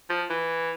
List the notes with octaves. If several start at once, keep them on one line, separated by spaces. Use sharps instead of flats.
F3
E3